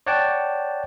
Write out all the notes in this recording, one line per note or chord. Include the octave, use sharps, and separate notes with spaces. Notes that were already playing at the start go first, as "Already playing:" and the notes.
C#5 D5 F#5 G5 A5